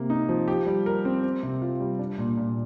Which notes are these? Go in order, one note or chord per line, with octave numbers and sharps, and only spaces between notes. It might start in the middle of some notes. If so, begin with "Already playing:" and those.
Already playing: C3 A#3
D#4
F3
G4
G3
A#4
C4
C4
C3
F4
G3
D4
A#2
A#2